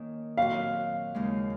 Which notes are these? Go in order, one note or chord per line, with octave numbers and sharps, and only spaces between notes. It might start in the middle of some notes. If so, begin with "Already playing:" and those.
Already playing: D#3 A#3 C#4
A#2 F#3 C4 F#4 F5
D#2 C#3 G#3 D#4